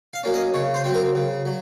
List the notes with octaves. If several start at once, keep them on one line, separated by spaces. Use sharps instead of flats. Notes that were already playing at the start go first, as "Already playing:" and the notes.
F5
F#3 A#3 C#4
D#5
C#3 C#5
C5
F#3 C4
A#4
C#3
F#3